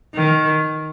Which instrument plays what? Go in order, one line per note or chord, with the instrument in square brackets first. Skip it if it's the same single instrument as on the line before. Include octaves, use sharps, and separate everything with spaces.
[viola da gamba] D#3